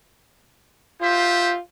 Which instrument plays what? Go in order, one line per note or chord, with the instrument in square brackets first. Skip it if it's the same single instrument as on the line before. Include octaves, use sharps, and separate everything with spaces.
[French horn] F4 [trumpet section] G4 C5 E5